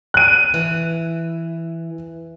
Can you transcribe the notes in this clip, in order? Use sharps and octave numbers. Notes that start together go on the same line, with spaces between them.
F#6 D#7
E3